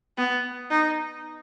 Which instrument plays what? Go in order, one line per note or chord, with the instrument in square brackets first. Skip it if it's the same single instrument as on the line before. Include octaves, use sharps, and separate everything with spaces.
[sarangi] B3
D#4